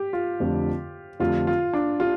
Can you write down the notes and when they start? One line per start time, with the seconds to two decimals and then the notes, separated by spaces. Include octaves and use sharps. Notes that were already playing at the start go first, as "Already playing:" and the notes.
Already playing: G4
0.13 F4
0.40 F2 D3 A3 D4 G4
1.20 F2 D3 A3 D4 F4 G4
1.47 F4
1.73 D4
2.00 D4 F4 G4